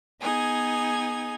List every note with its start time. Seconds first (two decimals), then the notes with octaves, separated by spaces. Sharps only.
0.21 B3 D#4 G#4 G#6